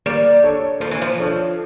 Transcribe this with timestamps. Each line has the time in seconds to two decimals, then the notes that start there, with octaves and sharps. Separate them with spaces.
0.06 G3 A#3
0.43 D4 A4 C#5
0.80 F3 A#3
0.91 E3
1.02 F3
1.19 D4 A4 C#5